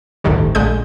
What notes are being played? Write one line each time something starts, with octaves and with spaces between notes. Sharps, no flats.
G1 D2 A2 D#3 G3
A#1 D3 G#3 D#6 G6